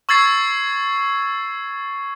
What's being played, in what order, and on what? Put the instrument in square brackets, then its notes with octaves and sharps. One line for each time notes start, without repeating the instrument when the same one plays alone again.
[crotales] C#6 E6 G#6 A6 C7